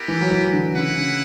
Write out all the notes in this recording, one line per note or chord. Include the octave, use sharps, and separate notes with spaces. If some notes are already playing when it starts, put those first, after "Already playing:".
Already playing: B3 E4 G4 A#4
E3
F#3
E3
D3
C#3 A#3 E4 B4 F#5
C#3